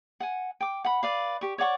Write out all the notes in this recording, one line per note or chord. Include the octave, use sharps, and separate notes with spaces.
F#5 G#5
G5 D6
F#5 B5
B4 D5 F5
G4 C#6
C#5 D5 F#5 C#6